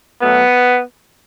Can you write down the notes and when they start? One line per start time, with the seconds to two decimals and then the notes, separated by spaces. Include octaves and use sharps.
0.21 B2 F#3 A3 B3